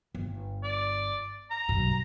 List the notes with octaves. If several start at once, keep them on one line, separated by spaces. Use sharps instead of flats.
G1
D5
A#5
B1 G2